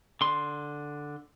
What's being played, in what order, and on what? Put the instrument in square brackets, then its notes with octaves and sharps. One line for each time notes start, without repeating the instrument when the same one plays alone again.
[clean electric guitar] D3 C6